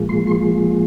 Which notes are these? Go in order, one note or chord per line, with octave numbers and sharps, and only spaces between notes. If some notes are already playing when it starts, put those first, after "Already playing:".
Already playing: A#2 F3 G#3
C6
C6